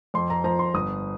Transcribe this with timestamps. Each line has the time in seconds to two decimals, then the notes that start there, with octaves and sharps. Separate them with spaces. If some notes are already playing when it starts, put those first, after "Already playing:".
0.14 F2 C6
0.30 A#5
0.44 F3 A#5
0.59 C6
0.74 G1 D#6